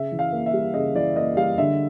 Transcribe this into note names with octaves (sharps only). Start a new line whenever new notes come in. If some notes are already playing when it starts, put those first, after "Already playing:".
Already playing: C#3 E5
E3
F5
A#3
E5
G3
C#3 D#5
E3 D5
A#3 D#5
G3 F5
D3 E5